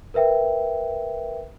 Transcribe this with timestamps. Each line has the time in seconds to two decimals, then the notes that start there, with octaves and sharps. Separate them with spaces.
0.14 A#4 B4 E5 G5